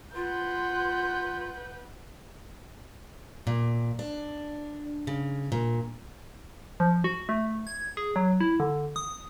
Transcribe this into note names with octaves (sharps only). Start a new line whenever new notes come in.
F4 B4 F#5 C6 G6
A#2
D4
C#3
A#2
F3
F#4
A3
G#6
G#4
F#3
E4
D3
D#6